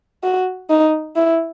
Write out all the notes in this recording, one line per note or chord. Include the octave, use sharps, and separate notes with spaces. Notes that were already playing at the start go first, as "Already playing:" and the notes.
F#4
D#4
E4